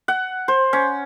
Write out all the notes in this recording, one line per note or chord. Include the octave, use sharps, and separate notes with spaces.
F#5
C5
C#4